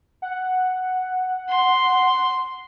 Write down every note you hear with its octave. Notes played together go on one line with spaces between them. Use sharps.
F#5
C6